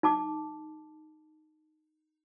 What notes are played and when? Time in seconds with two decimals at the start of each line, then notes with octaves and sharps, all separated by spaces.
0.03 D#4 A5 D6